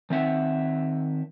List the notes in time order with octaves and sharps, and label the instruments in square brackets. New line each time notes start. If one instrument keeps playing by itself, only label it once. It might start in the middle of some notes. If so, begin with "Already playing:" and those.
[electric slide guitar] D#3 C4 E5 F#5